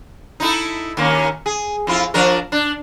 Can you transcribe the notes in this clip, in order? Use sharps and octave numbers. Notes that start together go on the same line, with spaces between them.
D#4 E4 A4
D#2 A#3 C#4
G#4
F2 E4 F4
F3 D4 A#4
D4